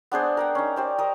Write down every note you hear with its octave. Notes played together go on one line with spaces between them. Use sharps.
B3 D4 G#4 C5
A#4 F#5 G5
C#4 D#4
G4 C5 D5
A#4 D#5